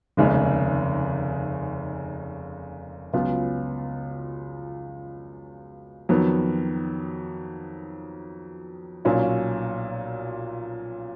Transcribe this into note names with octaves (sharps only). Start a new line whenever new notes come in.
F1 D#2 C#3 G#3 D#4
C#2 C#3 F#3 B3 F4
F2 D#3 F#3 B3
B1 A#2 F#3 C#4 F4